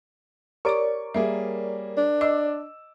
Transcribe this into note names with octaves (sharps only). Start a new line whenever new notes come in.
G4 A#4 C#5 D5 C#6 D6 D7
G3 A#3 G#4 E5
D4
D#5 D6 E6